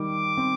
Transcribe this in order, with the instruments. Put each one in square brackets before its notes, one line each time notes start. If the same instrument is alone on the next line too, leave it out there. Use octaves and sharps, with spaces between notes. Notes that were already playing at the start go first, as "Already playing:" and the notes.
Already playing: [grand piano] D#3 G3 [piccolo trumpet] D6
[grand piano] C4